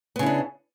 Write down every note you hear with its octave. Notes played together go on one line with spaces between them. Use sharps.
C#3 B3 D4 E4